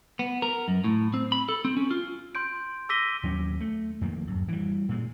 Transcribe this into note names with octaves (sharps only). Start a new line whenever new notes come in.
B3
A#4
F#2
A2
C4
B5
A4
C4
C#4
F4
C6 G6 D7
D6 E6 A#6 B6 D#7 G7
D#2 F#3 C#4
A3
F2 D#3 A#3
D1 F#2
E3 G3
A#2 G#3